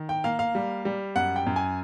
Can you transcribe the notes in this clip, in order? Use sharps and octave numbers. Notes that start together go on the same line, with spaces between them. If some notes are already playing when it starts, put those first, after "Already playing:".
Already playing: D#3
G5
A#3 F5
F5
G3
G3
F#2 F#5
G5
F#2
G#5